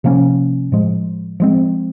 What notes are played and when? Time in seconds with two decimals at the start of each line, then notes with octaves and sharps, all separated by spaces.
0.04 C3 F3 A#3 C#4
0.72 A2 F3 G#3
1.40 F3 G#3 C4